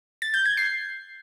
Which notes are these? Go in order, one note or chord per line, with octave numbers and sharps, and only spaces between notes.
A6
G6
G#6
C7